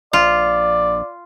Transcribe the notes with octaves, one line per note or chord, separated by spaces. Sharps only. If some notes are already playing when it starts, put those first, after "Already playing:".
A#1 F4 D5